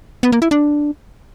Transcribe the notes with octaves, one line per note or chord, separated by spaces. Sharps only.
B3
A#3
E4
D4